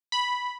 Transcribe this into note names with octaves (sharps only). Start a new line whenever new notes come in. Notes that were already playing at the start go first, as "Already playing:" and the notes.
B5